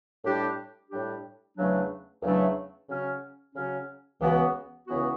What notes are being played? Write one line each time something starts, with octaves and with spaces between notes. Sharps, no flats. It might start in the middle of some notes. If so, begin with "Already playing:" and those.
A2 G3 D4 G4
A2 G3 D4 G4
E2 C#3 F#3 A3 D4
E2 C#3 F#3 A3 D4
C#3 F#3 C#4
C#3 F#3 C#4
C#2 C#3 E3 B3 F#4
C#2 C#3 E3 B3 F#4